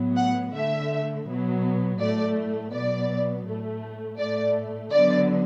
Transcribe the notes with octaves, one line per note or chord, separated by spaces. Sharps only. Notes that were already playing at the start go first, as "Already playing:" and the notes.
Already playing: A2 F#3 B3
F#5
D3 A3 E5
B2 F#3 B3
A2 A3 D5
B2 F#3 B3 D5
A2 A3
A2 A3 D5
D3 F#3 B3 D5